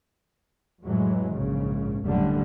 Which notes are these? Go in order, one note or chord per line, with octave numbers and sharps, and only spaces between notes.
F2 A2 E3 F#3 G#3
A#1 G#2 C#3
F#1 D#2 A2 D3 G3